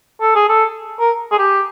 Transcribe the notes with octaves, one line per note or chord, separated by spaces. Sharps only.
A4
G#4
A4
A#4
G#4
G4